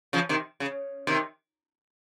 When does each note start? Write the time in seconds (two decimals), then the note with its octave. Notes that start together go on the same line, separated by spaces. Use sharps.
0.13 C#3 F3
0.29 C3 D#3
0.60 C#3
1.07 C3 D#3